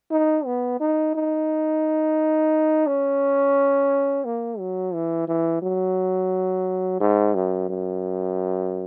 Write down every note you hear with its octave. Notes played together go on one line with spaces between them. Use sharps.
D#4
B3
D#4
D#4
C#4
A#3
F#3
E3
E3
F#3
G#2
F#2
F#2